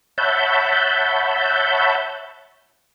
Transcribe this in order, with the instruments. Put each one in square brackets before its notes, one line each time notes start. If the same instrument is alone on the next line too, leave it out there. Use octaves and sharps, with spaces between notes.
[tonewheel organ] C#5 E5 F#5 A5 B5 G6